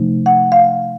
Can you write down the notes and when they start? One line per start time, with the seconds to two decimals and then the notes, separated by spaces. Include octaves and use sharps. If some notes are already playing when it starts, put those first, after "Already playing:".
Already playing: C3 F3 A3 D#4
0.26 F#5
0.52 F5